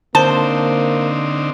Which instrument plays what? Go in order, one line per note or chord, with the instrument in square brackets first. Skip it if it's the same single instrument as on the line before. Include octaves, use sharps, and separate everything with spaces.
[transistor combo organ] D3 C4 D#4 [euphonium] A#3 [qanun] C5 [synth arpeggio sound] A5